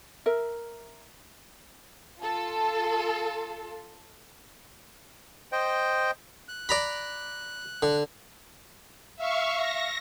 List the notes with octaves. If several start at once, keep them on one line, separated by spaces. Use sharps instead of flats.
A#4 E5
F4 A4
C5 D#5 G5
F#6
D5 A#5 B5
D3
E5 F5 C#6
A#6